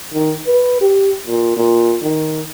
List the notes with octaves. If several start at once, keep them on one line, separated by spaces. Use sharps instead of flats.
D#3
B4
G4
A#2
A#2
D#3